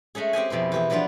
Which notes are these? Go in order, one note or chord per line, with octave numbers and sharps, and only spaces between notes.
G#3 A3 C#4 G#4
C4 G4 G#4 G#5
F2 B2 E4 C5
E3 G4 G#4
F3 F#3 B3 D4 F4